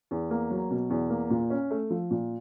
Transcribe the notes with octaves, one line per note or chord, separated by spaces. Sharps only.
E2
A#3
F#3
B2
E2
A#3
A#2
C#4
A3
F3
A#2